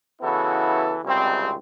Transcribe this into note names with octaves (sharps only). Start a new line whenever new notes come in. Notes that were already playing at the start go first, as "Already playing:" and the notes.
C#3 E3 B3 E4 F#4 A4
G#1 C#2 C3 G3 C4